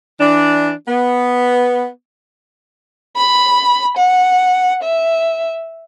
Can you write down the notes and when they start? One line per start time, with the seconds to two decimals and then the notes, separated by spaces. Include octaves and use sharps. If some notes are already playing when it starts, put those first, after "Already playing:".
0.20 E3 D4
0.87 B3
3.17 B5
3.97 F#5
4.83 E5